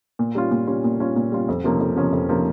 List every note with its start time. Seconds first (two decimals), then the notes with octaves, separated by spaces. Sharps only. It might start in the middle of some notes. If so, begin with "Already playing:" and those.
0.19 A#2
0.35 G3 C#4 F4
0.51 A#2
0.67 G3 C#4 F4
0.84 A#2
0.99 G3 C#4 F4
1.16 A#2
1.32 G3 C#4 F4
1.48 F2
1.64 C3 F3 A#3 C#4
1.80 F2
1.96 C3 F3 A#3 C#4
2.12 F2
2.29 C3 F3 A#3 C#4